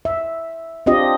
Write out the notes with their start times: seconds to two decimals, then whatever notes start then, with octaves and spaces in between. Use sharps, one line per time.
0.05 E5
0.86 C4 D4 F4 G4 D#5